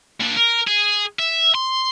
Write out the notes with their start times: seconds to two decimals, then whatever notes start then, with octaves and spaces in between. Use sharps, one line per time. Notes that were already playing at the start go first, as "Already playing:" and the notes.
0.20 A#2 D4
0.36 A#4
0.67 G#4
1.19 E5
1.55 C6